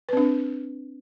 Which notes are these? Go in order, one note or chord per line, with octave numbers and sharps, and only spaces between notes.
C4 D4 B4